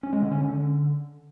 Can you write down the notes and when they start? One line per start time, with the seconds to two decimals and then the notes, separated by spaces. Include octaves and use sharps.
0.03 C#4
0.13 G#3
0.22 D3
0.31 C#4
0.41 D3